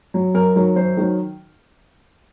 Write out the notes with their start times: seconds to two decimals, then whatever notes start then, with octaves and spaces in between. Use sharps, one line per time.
0.14 F#3
0.34 F#2 A#4
0.56 D#3 F#3
0.76 F#2 C5
0.97 D#3 F#3